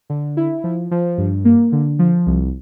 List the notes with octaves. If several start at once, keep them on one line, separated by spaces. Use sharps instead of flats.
D3
E4
F3
F3
G2
A#3
D3
F3
C2